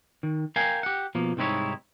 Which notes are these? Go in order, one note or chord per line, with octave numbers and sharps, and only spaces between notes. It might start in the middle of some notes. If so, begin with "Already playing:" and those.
D#3
A#4 F5 G5 G#5
G4 F#5
B2 F3 A#3
C2 G#2 C4 D#4 E4 C#5